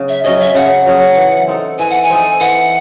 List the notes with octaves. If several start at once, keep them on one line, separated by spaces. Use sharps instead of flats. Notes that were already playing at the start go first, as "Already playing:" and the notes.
Already playing: C#3 F#3 C#4
E5
F#3 C#4 G#4 D#5
E5
C#3 F#5
F#3 C#4 G#4
E3
C4 D#4 A4
E3 G#5
F#5
G#5
C4 D#4 A4
E3 F#5